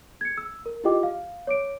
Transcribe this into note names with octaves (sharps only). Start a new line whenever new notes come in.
G#6 C#7
E6
A#4
E4 F4 G4 D#5 G5 D6
F5
C#5 D6 D7